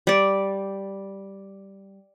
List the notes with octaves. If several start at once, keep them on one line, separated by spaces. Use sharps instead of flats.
G3 D5